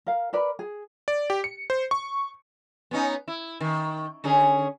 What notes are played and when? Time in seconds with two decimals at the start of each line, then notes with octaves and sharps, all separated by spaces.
0.07 A#4 F5
0.33 A#4 B4 D5 B5
0.59 G#4
1.08 D5
1.30 G4
1.44 C#7
1.70 C5
1.91 C#6
2.91 B3 C#4 D#4
3.28 E4
3.61 D#3
4.24 D3 C#4 G#4